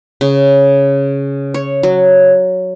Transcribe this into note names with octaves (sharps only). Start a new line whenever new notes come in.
C#3
C#5
F#3